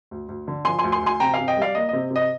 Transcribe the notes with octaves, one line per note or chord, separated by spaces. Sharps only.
D2
D2
D3
F3 G#5 C6
G#5 C6
D2
G#5 C6
D2 G#5 C6
C3 G5 A#5
C3 F5 G#5
D#5 G5
G3 D5 F5
A#3 D#5
C3 D#5
C3 D#5